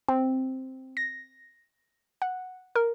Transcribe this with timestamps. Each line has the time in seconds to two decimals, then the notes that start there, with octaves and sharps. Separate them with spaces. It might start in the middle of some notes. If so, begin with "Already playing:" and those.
0.08 C4
0.97 A#6
2.22 F#5
2.76 A#4